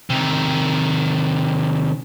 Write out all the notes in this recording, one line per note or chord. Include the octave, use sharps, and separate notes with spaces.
C3 D#3